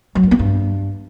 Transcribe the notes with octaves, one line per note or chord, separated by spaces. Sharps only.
F#3
G2
B3
G2